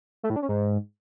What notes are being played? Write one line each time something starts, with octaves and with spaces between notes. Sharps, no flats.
A3
A2
D4
C#4
G#2